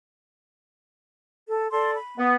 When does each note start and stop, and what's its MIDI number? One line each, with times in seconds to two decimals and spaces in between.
1.48 1.67 69
1.71 1.93 69
1.71 1.93 74
1.71 1.93 84
1.95 2.21 83
2.18 2.35 59